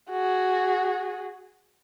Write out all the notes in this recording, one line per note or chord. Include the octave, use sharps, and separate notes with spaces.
F#4 G#4